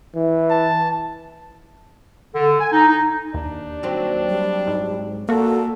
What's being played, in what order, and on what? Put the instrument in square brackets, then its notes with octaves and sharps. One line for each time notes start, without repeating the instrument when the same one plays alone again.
[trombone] E3
[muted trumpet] A5
[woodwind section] D3
G#5
D#4
D#4
[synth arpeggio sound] D#2 [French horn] D4
[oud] F#3 C4
[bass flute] G3
[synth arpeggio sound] G#2
[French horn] A#2 [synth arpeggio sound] A#3 F#4 [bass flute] A4